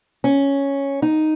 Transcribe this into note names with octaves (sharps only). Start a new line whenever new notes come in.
C#4
D#4